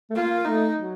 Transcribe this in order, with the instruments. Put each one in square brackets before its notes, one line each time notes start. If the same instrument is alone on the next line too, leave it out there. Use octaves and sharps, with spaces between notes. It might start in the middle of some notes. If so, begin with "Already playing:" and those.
[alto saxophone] A3
[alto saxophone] A#3 [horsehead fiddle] F4
[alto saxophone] A3 [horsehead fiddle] D#4
[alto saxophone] F#3